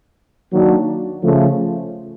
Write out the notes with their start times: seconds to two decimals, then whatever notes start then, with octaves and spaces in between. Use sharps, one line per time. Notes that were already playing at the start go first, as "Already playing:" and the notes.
0.52 D#3 F#3 A#3 D4 F#4
1.23 C#3 F3 A3